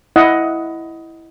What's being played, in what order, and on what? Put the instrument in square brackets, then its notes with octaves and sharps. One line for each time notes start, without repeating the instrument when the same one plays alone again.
[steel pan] E4 D#5 F#5